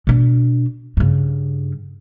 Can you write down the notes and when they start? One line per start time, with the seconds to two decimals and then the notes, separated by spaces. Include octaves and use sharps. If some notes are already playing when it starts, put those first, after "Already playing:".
0.07 B2 D4
0.97 G2 C#3